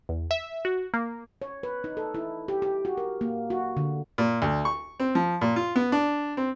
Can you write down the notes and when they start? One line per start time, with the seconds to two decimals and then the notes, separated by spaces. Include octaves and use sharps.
0.09 E2
0.31 E5
0.65 F#4
0.94 A#3
1.42 C#5
1.63 B4
1.84 D#4
1.97 A4
2.15 E4
2.48 G4
2.62 G4
2.85 F#4
2.98 A#4
3.21 A#3
3.50 F#4
3.77 D3
4.18 A#2
4.42 D2
4.65 C#6
5.00 C4
5.15 F3
5.41 A#2
5.56 F4
5.76 B3
5.92 D4
6.37 C4